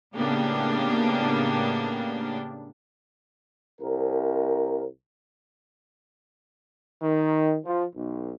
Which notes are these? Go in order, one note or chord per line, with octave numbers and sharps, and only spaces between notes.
A2 C#3 A#3 B3 D4 G4
C2 A#4
D#3
F3
B1